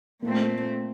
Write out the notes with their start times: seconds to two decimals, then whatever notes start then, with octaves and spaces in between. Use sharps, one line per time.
0.22 A#2 A3 A#3 C4